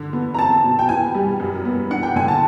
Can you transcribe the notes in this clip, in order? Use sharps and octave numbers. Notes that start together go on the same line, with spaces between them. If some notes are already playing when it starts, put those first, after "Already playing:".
Already playing: D3
B3
A#5
C4 A5
B2
G5
B3 G#5
G3
F#2
B3
D4 F#5
G5
D3 G#5
A5